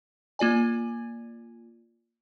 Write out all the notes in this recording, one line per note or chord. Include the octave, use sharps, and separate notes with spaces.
A#3 F4 D5 G#5